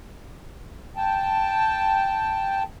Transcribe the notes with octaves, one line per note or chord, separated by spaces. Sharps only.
G5 A5